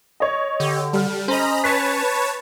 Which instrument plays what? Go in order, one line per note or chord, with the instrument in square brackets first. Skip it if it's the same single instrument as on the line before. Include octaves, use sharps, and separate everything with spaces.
[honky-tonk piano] C#5 D#5
[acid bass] D3 [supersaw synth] G4
[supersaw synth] G3 [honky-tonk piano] A4 F6
[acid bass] C#4 [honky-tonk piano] C5 [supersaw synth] D#5 A#5 B5
[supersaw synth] B4 C#5 A5 [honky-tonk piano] B6